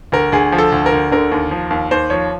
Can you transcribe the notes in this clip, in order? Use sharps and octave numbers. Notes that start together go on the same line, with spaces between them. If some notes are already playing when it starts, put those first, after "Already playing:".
D2 A#4
D2 G#4
F3
A4
D2
A#4
D2
D3 A#4
D#2
F3
D#2
D#2 C5
F3 C#5